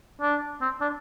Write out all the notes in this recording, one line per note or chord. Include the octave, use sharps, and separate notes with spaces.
D4
C4
D4